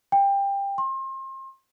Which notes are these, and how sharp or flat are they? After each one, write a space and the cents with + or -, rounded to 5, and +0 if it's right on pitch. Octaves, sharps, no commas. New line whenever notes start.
G5 +20
C6 +35